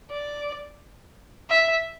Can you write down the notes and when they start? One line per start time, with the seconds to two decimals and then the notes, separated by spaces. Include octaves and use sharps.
0.11 D5
1.50 E5